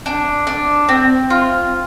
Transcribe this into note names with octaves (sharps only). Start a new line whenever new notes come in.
D4
D4
C4
F4